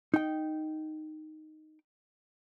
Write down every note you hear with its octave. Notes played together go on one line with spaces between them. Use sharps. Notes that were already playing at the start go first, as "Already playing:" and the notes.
D#4 G5